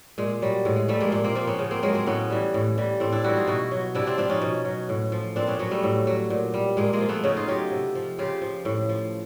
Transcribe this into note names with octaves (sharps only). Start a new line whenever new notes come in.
A#2 G#3
F#3 G3
A2 G#3
G#3
F3 G3 A3
G#3 A#3
A#2
A#3 C4
F3 A#3 C4
B3 C#4
C#3
A#3 C4
F#3 G#3 A#3
A#3 C4
A2 B3 C#4
E3 G3
A2
E3 G3
A2 C4 D4
D4 E4
E3 G3 E4 F#4
D#4 F4
B2 E4 F#4
F#3
C3 D4 E4
C4 D4
F3 C4 D4
C#4 D#4
B2
F#3
A2
F3
A#2 C4 D4
B3 C#4
F#3 B3 C#4
G3 A3
A2
F#3
A#2
G3
A#2 G#3 A#3
G#3 A#3
F3
A3 B3
C#3 C#4 D#4
D#4 F4
F#3 F4 G4
C3
F3
C#3 F4 G4
F3
A2
F3